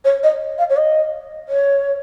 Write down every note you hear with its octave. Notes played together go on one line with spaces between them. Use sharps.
C#5
D#5
F5
C#5
D#5
C#5